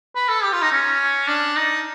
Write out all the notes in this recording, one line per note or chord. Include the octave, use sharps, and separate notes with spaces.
B4
A4
G4
F4
D#4
C#4
D4
D#4